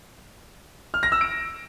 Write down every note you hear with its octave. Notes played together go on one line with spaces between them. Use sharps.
F6
A#6
E6
D7